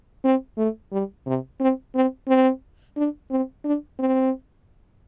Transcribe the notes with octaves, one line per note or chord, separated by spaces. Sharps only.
C4
A3
G3
C3
C4
C4
C4
D4
C4
D4
C4